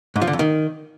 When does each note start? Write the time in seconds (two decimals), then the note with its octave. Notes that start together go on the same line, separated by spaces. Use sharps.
0.16 G#2
0.21 F3
0.27 D3
0.33 F2
0.39 D#3